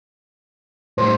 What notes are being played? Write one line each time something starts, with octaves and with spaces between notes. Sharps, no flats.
A2 G3 C5